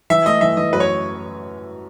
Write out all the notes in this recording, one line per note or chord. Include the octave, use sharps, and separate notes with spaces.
E3 E5
A3 D#5
E3 E5
E3 D#5
F#2 B4
C#5